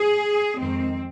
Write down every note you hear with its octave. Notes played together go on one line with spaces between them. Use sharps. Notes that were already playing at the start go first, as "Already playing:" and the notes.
Already playing: G#4
F2 D#3 G#3 C4